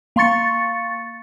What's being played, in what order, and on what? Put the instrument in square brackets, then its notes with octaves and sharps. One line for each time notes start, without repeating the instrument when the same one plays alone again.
[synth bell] A#3 F5 C6 C#6 A6 C#7